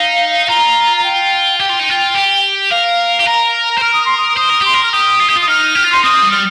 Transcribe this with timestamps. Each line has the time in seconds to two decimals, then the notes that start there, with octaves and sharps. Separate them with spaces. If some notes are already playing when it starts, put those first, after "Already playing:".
Already playing: D#4 F5
0.48 F4 A#5
0.97 A#5
1.04 G5
1.59 G4 G5
1.69 F4
1.79 D#4
1.89 F4
2.15 G4
2.70 A#4 F5
3.20 G4
3.26 A#4 A#5
3.78 C5
3.82 A#4 F6
3.94 D#6
4.06 C6
4.17 D#6
4.37 C5 D#6
4.49 A#4
4.61 G4 C6
4.74 A#4
4.83 F6
4.92 G4 D#6
5.20 F4
5.28 G4
5.36 F4
5.41 D#6
5.48 D#4 F6
5.75 G4
5.85 F4
5.92 D#4 C6
6.04 C4 D#6
6.23 G3
6.31 F6